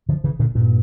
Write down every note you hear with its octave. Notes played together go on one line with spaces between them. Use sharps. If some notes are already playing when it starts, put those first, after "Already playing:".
D3 F3
C#3 E3
A#2 D3
G2 A#2